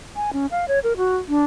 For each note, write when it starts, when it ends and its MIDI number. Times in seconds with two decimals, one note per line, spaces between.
0.16 0.30 80
0.33 0.46 61
0.51 0.65 77
0.68 0.79 73
0.84 0.97 70
0.97 1.17 66
1.28 1.45 62